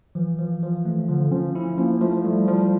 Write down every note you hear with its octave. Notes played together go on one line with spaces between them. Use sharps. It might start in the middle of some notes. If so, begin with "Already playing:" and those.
E3 F3
F3
F3
A3
D3 F3
F3 C#4
C#4 E4
F3 A#3
A#3
F3 A3
G3 A3
F3 G3